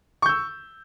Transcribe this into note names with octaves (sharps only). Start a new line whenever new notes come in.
C#6 E6 G6